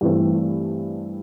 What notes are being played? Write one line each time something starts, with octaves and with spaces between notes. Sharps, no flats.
G2 E3 A3 C4